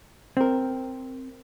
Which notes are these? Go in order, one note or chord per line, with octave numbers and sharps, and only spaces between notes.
C4 A#4